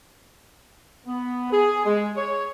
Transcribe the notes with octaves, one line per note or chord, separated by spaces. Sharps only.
B3
G#4
G#3
C#5